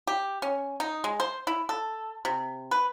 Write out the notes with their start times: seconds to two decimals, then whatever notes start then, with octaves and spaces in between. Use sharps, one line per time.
0.07 G4
0.42 C#4
0.80 D#4
1.04 G#3
1.20 C5
1.47 E4
1.69 A4
2.25 C3
2.71 B4